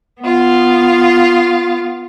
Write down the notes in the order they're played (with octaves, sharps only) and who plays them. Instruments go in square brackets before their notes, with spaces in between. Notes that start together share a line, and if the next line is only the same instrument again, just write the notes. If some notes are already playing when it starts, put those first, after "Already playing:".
[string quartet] B3 F4